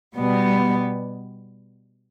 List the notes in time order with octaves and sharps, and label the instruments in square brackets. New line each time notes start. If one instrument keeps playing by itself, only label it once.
[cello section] B2 G3 B3